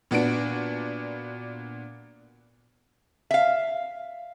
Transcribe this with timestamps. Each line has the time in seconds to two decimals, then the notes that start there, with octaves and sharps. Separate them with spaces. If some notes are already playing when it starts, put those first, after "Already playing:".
0.11 A#2 B3 D4 F#4 D7
3.31 E5 F5